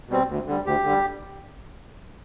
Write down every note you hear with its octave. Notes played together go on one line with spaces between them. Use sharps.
B2 G3 C4
D2
D3 G3
D2 G4
D3
G3